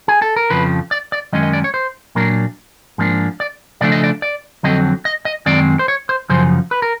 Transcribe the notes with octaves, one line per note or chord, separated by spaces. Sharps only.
G#4
A4
A#4
F2 C#3 F3 B4
D5
D5
F#2 D#3 G#3 C#4 D#5
D#5
D5
C#5
C5
A#2 F#3 A#3 D4 A#4
G#2 F3 A#3 D4
D5
C#3 F3 A3 D4 D5
D#5
D5
D5
F2 D3 F#3 C4 D#5
D#5
D#5
F#2 D#3 G#3 C4 D5
C5
C#5
C5
F#2 C#3 F3 C5
B4
A#4